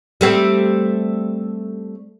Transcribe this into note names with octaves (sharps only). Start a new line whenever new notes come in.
G3 A3 C4